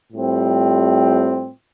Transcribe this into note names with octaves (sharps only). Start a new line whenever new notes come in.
A2 G3 C4 F4